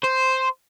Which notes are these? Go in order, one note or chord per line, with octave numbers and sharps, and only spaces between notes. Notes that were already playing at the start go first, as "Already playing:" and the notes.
C5